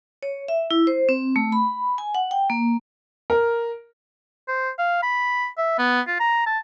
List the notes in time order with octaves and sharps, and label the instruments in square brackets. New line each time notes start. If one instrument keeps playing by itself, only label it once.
[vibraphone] C#5
E5
E4
C5
C4
A3
B5
G#5
F#5
G5
A#3
[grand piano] A#4
[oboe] C5
F5
B5
E5
B3
F4
A#5
A5